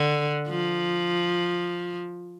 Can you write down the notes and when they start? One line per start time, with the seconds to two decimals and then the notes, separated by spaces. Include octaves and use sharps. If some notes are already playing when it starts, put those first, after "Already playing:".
Already playing: D3
0.49 F3